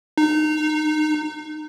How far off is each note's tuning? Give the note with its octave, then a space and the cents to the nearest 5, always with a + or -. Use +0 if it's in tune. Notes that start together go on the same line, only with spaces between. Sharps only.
D#4 -25